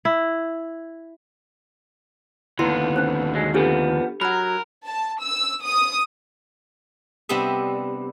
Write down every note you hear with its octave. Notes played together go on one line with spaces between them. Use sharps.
E4
D#2 D3 B3 E4 C6
C#4 C5
F#3 G#3
F3 B3 D4 G4 A4
F#3 A#4 F#5 B5
A5
E6
D#6
C3 G3 B3 D4 D#5 E5